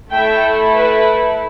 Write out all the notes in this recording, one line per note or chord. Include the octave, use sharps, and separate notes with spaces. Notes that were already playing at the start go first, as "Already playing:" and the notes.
A3 E4 A4 E5 G5
B4